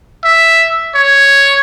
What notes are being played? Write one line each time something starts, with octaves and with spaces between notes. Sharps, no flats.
E5
C#5